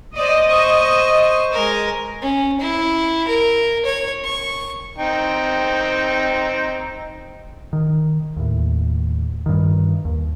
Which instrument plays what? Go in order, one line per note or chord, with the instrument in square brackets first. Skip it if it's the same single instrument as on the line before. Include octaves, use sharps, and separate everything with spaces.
[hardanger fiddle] C5 D5 [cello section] D#5
[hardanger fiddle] C5 C#6
G#3 A#4
C#4
E4
A#4
C#5
C#6
[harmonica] C4 D#4 G5
[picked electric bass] D#3
D#2 A2
G2 D#3
D#2